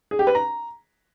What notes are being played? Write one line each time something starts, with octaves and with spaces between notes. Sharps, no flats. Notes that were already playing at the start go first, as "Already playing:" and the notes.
G#4
G4
B4
A#5